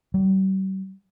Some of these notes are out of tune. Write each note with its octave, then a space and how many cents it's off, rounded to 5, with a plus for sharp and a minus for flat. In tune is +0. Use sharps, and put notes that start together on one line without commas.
G3 -45